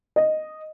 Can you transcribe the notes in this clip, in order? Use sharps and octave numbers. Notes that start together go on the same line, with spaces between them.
D#5